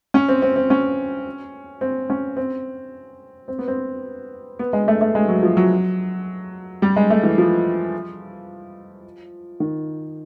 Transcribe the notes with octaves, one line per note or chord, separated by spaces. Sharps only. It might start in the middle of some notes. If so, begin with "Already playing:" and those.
C#4
C4
C4
C4
C#4
C4
C#4
C4
C4
B3
C4
B3
G#3
A3
A3
G#3
F#3
F3
F#3
G3
G#3
A3
E3
F3
D#3